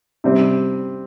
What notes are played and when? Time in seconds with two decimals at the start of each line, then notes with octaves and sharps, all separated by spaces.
0.24 C3 G3 C4